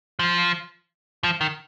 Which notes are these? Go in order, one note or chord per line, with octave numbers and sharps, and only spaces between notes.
F3
F3
D#3